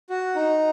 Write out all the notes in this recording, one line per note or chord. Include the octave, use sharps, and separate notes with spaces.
F#4
D#4